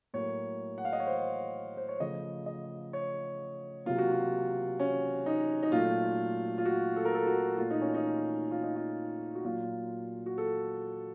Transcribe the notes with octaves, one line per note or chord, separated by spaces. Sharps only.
A2 F#3 A#3 C#5
F#5
F5
D#5
C#5
C5
C5
C#5
C#3 F3 A3 D#5
D#5
C#5
C3 F#3 A#3 F4
F#4
F4
C#4
D#4
D#4
A#2 F#3 A3 F4
F4
F#4
A4
A#4
A4
F#4
A#2 A3 F4
D#4
C#4
D#4
F4
D#4
F4
F#4
A#2 F#3 A#3 F4
F#4
A4